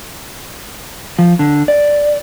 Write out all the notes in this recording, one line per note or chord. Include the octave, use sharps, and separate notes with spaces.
F3
D3
D5